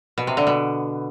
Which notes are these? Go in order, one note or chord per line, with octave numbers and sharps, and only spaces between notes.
B2
C3
D3
B2